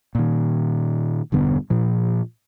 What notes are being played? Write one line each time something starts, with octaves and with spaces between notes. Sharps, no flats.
A#2 D#3
E1 G2 D3 B3
A#2 F3